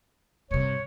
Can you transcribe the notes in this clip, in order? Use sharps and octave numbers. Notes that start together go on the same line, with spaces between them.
G2 C3 C#5